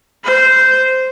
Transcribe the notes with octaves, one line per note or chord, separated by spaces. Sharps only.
C5